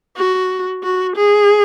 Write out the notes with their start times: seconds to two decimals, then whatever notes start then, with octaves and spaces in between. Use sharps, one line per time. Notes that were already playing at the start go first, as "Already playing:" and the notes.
0.17 F#4
0.83 F#4
1.16 G#4